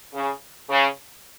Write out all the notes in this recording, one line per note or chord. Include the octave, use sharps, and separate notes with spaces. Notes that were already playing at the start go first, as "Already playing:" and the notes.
C#3
C#3